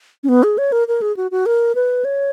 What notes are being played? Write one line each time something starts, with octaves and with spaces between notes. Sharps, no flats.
C#4
B3
G#4
C#5
A#4
A#4
G#4
F#4
F#4
A#4
B4
C#5